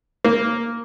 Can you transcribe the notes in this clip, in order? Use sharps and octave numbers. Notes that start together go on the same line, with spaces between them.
A#3